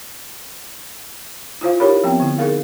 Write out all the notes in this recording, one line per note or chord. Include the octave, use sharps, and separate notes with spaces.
E4 F4 C5 F5
D#4 E4 G4 A#4 C#5 B5
F3 B3 C4 G5
D3 E4
D#4 G#4 A#4 F5